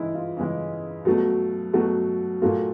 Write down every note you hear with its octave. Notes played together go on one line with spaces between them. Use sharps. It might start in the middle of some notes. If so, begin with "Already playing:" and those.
Already playing: C#3 E3 G#3 D#4 E4
F4
C#3 E3 G#3
B2 F#3 A3
B2 F#3 A3 F#4
A#2 F#3 A3 F4